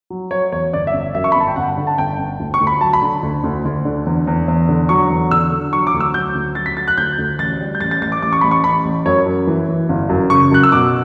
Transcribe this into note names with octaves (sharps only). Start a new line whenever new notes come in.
F#3
F#3 C#5
E2 C#5
G1 D5
E5
G1
E5
F#2 E5
C#6
B5
G1 A5
G5
G1 F#5
D3
A5
G1 G5
G1
D2
C#6
D2
B5
F#3 A5
B5
D3
D2
D2
D2
D3
E2
E2
E2
D3
F#3 C#6
E2
D3 E6
D3
F#3 C#6
D6
D2
E6
F#3 G6
D2
F#3 A6
B6
F#3 A6
F#6
D2 G6
D2
A1 A6
G3
G6
A1 A6
A6
A1 A6
D6
A1 D6
C#6
A1 B5
C#6
A1 B5
A1
F#2 C#5
F#2
E3
E3
G1
F#2
C#3 C#6
F#2 F#6
E6
B2 D6